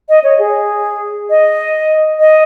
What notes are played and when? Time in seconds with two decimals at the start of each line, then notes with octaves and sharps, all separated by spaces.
0.09 D#5
0.24 C#5
0.39 G#4
1.30 D#5
2.20 D#5